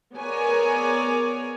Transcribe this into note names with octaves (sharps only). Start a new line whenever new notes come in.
B3 G#4 A#4 C#5 D5 G#5